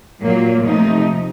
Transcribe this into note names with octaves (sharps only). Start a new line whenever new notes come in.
A#2 F#3 A#3
C3 F3 A3 D#4